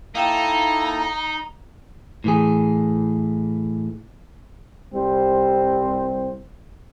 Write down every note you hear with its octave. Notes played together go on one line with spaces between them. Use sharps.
A#3 D#4 E4 A4 F5 G5 A#5 E7
A2 E3 G#4
C2 G3 C4 C5